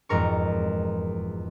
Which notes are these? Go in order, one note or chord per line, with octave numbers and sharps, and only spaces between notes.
E1 F2 G#2 A#4 C#6